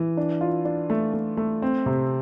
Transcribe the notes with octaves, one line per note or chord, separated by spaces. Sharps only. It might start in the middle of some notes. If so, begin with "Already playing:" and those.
Already playing: E3
D4
F4
D4
A3
A3
A3
C4
C3